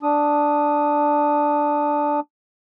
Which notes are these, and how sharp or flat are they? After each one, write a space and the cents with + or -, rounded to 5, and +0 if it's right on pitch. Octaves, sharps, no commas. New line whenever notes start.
D4 +0 D#6 +0